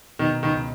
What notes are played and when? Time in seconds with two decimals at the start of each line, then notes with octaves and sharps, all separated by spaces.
0.19 B2 D#3
0.43 C#2 D#3